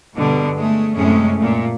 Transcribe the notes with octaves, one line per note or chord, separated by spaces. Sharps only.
G2 B2 D3 G3
G#3 A3
F#2 A2 C3 G#3 A3 C#4
A#2 A3